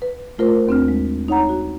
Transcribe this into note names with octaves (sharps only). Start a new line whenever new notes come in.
B4
A3 F4 A#4 C5
D#2 C4 D4 F6
G#3
D#4 C#5 F#5 A#5
F#4